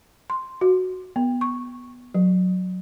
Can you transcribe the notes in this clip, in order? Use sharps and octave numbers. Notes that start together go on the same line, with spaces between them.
C6
F#4
B3
C#6
F#3